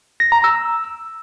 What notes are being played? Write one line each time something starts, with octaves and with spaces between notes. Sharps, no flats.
A#6
A#5
E6